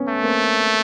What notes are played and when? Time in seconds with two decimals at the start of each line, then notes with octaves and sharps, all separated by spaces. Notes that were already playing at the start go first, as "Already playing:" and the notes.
Already playing: B3 C#4
0.08 A3
0.23 A#3 C4